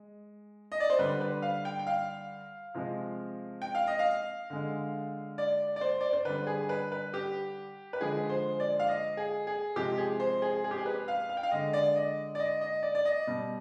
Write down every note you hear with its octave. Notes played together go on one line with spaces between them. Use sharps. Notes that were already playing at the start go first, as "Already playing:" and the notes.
Already playing: G#3
D#5
D5
C5
D3 G3 B4
B4
F5
G5
G5
F5
C3 F3 G#3
G5
F5
D#5
F5
D3 G#3
D5
D5
C5
D5
C5
D3 G3 B4
G#4
B4
B4
G4
B4
D3 F3 G#3 G#4
C5
D5
F5
D#5
G#4
G#4
C3 F3 G#3 G4
G#4
C5
G#4
G#4
G4
G#4
B4
F5
F5
G5
F5
D3 G#3 D#5
D5
D#5
D5
D#5
D#5
D5
D5
D#5
B2 G3